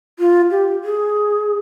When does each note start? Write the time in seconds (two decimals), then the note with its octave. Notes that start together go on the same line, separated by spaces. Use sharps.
0.19 F4
0.51 G4
0.84 G#4